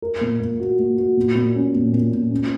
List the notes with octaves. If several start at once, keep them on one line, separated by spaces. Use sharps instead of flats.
A#4
A#2
A#3
F#4
A#3
F#4
A#2
A#2
C#4
A#2
A#2
A#2
C#4